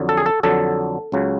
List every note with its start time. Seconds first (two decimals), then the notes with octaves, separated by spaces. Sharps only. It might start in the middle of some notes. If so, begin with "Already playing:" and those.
Already playing: F2 D3 F#3
0.09 A4
0.17 G#4
0.26 A4
0.43 F2 D3 F#3 A4
1.12 C#2 C#3 F#3